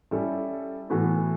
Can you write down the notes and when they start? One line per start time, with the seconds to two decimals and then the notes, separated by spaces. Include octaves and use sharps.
0.11 G3 C#4 E4 A4
0.90 A2 E3 B3 F#4 A4